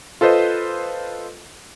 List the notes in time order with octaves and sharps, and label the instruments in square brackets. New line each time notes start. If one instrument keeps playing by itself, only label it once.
[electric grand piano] F4 A4 B4 C5 D#5